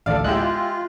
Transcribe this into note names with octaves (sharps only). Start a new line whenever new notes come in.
A1 D2 A4 D5 F5
G#3 E4 F4 G4 F#6